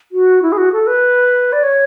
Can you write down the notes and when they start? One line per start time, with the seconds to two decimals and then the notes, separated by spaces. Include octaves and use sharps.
0.12 F#4
0.42 E4
0.52 G#4
0.58 F#4
0.72 A4
0.87 B4
1.53 D5
1.63 C#5